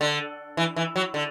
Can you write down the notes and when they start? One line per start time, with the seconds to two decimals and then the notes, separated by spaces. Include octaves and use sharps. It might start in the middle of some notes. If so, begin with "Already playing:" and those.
0.01 D3
0.57 E3
0.76 E3
0.96 F#3
1.14 D3